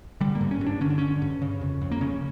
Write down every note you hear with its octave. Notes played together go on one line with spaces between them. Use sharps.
D3 G3
A#3
G2
C#4
G2
D4
D3 C#4
D4
D3 C#4
G2
C#3
F2
F2
A#3
C#3 C#4